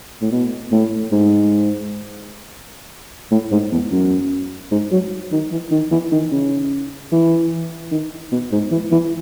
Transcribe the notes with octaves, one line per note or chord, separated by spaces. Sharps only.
A2
B2
A2
G#2
A2
G#2
E2
F#2
G#2
F#3
D#3
E3
D#3
E3
D#3
C#3
E3
D#3
B2
G#2
E3
E3